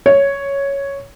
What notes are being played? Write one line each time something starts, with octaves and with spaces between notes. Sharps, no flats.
C#5